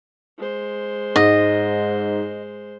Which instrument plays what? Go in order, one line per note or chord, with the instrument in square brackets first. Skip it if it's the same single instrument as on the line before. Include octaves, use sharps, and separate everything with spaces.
[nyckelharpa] G#3 C5
[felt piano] G#2 [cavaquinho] D#5